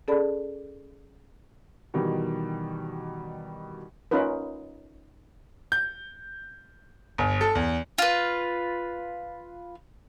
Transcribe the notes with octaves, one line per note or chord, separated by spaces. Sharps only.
C#4 G#4 A4 D5 A5 B5
B2 D#3 E3 G3
C#4 D#4 F4 A#4 B4
G6
G1
A4
E2
F4 B4